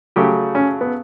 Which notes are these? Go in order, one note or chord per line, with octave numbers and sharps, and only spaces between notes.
C#3 F#3 A3 G4
C#4
B3